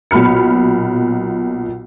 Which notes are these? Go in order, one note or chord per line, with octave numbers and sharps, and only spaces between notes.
B1 A#2 B5 F6 C#7